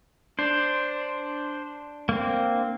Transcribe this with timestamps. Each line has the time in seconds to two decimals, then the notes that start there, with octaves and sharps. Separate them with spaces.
0.39 D4 C5
2.09 A#3 C4